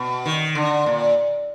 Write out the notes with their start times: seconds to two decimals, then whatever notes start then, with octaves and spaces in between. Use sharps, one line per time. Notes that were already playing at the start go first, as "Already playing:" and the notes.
Already playing: B2
0.26 D#3
0.55 D3
0.86 A#2